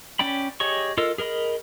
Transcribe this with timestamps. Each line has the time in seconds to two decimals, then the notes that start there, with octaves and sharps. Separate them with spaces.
0.19 C#4 D5 G5 B5
0.60 G4 G#4 C#5 D#5 C#6
0.97 F4 A4 A#4 D#5 E6
1.18 G#4 A#4 D#5 B5